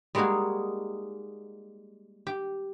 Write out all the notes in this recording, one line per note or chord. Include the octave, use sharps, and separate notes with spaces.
G3 G#3 A#3 D#4 F#4 G#4
G4